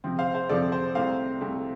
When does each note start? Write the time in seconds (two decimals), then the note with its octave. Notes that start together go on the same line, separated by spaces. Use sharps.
0.04 C3 F3 C4
0.19 C5 F5
0.34 C5 F5
0.49 C3 F3 C4 A4 D5
0.72 C5
0.95 C2 C3 A3 C4 C5 F5
1.41 C2 C3 A3 C4